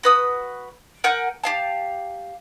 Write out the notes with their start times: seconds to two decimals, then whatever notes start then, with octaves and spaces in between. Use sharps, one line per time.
0.03 F#4 B4 D#6
1.04 A#4 F#5 G#5 G6
1.44 G4 F5 A5